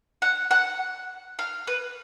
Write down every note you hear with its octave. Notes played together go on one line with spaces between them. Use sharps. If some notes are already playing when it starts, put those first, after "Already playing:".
F#5
F#5
F5
B4